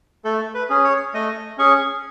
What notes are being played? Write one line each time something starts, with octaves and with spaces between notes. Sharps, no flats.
A3 A4
B4
C#4 G#4
C#5
A3 D#5
C#4 G#4 C#6